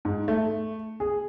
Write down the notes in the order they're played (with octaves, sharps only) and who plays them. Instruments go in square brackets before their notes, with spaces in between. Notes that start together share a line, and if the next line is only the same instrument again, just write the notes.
[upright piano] G#2
A3
G#4